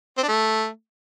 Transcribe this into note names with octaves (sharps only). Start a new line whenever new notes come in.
C4
D4
A3